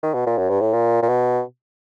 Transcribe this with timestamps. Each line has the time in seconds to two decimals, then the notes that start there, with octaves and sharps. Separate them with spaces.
0.03 D#3
0.14 B2
0.27 A#2
0.38 F#2
0.50 G2
0.61 A2
0.73 A#2
1.02 A#2
1.09 B2